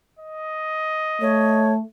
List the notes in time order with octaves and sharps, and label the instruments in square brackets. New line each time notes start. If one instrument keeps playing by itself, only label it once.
[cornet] D#5
[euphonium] A3 [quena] C#5